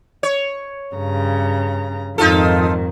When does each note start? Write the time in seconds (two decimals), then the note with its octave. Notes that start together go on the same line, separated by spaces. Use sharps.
0.23 C#5
0.95 G2 C#3 A#5
2.18 F2 G#2 D#3 D#4 F4 A4